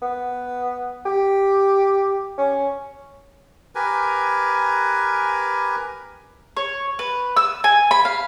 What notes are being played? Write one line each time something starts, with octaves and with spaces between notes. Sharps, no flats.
B3
G4
C#4
G4 A#4 B4 G#5
C#5
B4
E6
G#5
B5
F5